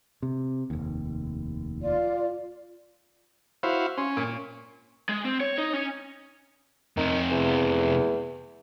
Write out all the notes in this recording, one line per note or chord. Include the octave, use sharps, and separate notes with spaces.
C3
F1 D#2
F4 D5
E4 F#4 C5 F5
C#4 C6
A#2
G#3
C4
C#5
D#4
C#4
F2 C3 D#3
E2